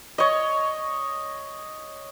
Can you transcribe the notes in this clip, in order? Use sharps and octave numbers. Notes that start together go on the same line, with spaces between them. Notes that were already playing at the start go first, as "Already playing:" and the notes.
C#5 D#5